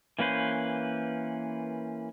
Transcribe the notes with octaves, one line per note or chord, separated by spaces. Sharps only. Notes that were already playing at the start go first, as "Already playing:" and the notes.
E3 A#3 C#4 B4 C5